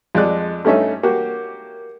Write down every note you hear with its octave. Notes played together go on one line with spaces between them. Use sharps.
F2 G#3 D5 F#6
G2 A3 C#4 D#4 E5
A#3 F#4 G4